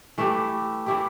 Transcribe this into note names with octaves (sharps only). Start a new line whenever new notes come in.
E3 A3 E4 G4
E3 A3 E4 G4